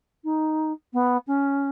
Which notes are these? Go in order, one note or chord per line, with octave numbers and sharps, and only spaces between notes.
D#4
B3
C#4